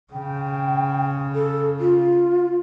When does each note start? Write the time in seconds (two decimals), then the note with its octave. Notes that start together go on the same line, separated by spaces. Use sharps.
0.13 C#3 G5
1.35 A4
1.80 F4